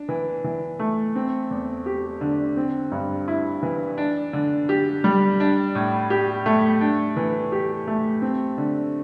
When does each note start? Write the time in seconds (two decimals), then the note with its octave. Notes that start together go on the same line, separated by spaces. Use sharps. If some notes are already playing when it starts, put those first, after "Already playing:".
Already playing: D4
0.09 E3
0.44 E3
0.79 A3
1.15 C4
1.51 E2
1.86 G4
2.21 D3
2.57 C4
2.92 G2
3.28 E4
3.63 E3
3.97 D4
4.33 D3
4.69 G4
5.04 G3
5.40 D4
5.75 A2
6.10 G4
6.46 A3
6.81 D4
7.17 E3
7.52 G4
7.87 A3
8.22 C4
8.58 D3